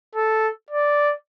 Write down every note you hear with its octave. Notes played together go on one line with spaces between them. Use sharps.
A4
D5